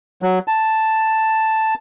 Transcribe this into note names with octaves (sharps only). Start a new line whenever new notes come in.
F#3
A5